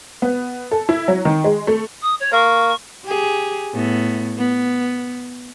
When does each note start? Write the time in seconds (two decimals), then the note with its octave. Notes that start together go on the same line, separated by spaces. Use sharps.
0.22 B3
0.71 A4
0.89 E4
1.08 F#3
1.25 D#3
1.44 G#3
1.67 A3
2.02 D#6
2.19 C#5
2.32 A#3 C#6
3.06 G4 G#4
3.74 A2 B3
4.38 B3